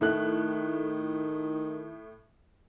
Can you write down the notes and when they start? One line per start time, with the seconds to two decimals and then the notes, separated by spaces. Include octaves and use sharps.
0.01 A2 D#3 A3 F#6